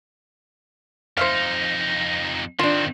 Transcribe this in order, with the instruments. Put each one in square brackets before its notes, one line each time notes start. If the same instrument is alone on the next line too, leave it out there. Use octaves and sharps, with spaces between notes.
[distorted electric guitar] F2 D#4 [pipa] C5 E5 F5
[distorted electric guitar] D#3 C4 [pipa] D4 F4